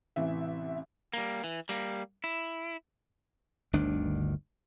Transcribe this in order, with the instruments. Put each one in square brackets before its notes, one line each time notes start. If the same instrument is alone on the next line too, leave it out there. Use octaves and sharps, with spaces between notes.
[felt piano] A1 C3 E3 E5
[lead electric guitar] G3 A#3
E3
G3 A#3
E4
[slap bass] G1 D2 D#3 D4